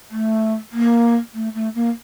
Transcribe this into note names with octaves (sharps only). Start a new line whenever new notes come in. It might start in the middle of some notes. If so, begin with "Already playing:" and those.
A3
A#3
A3
A3
A#3